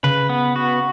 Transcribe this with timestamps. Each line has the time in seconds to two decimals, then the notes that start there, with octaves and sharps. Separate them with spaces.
0.03 C#3 B4
0.30 B3
0.56 F#4